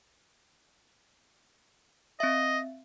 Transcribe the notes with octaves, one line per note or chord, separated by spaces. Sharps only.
C4 D#5 E5